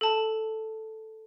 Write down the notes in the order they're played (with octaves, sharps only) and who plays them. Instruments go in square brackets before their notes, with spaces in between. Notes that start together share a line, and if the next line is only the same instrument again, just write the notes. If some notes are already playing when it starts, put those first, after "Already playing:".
[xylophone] A4 A5